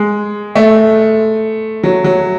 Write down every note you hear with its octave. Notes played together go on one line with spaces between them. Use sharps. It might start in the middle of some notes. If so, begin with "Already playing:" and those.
Already playing: G#3
A3
F#3
F#3